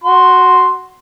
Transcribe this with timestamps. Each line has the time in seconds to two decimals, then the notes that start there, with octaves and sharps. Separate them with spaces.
0.04 F#4 C6